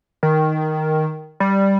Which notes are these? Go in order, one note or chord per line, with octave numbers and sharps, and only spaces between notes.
D#3
G3